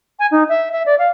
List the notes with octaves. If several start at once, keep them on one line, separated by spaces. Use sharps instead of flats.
G#5
D#4
E5
E5
D5
F5